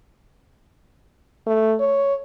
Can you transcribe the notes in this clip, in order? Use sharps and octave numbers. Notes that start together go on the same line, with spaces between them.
A3
C#5